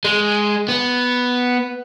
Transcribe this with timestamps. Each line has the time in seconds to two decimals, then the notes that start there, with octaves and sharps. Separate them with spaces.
0.05 G#3
0.69 B3